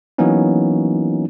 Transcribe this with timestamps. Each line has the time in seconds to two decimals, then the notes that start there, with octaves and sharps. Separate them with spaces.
0.18 E3 F#3 A#3 B3 C#4 D#4